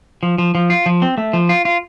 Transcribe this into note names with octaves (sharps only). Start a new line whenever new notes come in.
F3
F3
F3
F4
F3
C4
A3
F3
F4
F4